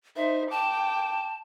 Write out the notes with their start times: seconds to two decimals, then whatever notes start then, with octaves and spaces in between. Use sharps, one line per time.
0.16 D#4 C5 E5
0.51 G5 A5 D6